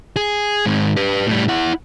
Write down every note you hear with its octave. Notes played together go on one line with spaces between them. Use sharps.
G#4
G#2 D#3
G4 B4
A2 G3
E4 F#5